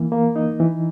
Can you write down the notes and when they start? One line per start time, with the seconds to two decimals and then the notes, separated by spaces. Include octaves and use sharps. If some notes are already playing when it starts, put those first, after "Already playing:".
Already playing: E3 A#3
0.12 A#3
0.36 D#4
0.59 E3